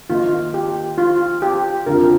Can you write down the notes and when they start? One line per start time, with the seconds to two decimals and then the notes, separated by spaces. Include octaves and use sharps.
0.10 D#3 A#3 D#4 F4
0.54 G4
0.98 F4
1.42 G4
1.86 F2 D3 F3 C4 F4 A#4